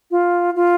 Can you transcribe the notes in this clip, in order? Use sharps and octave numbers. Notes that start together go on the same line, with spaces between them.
F4
F4